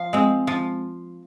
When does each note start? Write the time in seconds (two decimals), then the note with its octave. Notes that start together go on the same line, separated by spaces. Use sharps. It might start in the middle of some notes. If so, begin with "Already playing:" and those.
Already playing: F3 F5
0.13 G#3 C4
0.47 F3